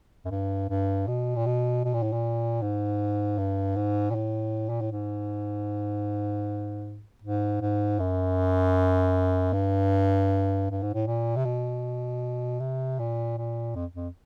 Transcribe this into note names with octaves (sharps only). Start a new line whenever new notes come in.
F#2
G2
G2
B2
A#2
B2
B2
A#2
A2
A#2
G#2
G2
G#2
A#2
A2
A#2
A2
G#2
G#2
G#2
F#2
G2
G2
G#2
A2
A#2
C3
B2
C3
A#2
A#2
F2
F2